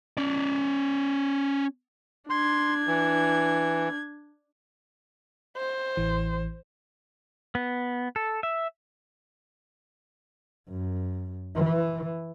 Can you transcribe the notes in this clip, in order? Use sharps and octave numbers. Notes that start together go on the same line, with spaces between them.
C#4 D5
D4 C6 G#6
E3
C5
A1 E3
B3
A4
E5
F#2
E3